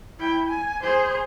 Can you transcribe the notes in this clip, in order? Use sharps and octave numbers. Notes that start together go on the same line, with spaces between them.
E4 G5
G#5
G#4 C5